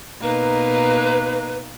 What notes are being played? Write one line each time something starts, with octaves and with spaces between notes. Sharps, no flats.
B2 A#3 D#4 B4